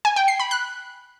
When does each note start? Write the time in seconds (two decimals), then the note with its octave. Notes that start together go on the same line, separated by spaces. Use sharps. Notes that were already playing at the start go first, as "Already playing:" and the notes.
0.05 G#5
0.16 G5
0.28 C7
0.40 B5
0.51 F#6